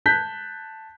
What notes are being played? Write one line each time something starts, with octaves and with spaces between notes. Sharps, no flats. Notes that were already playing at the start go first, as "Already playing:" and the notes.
A5 F#6 G6 B6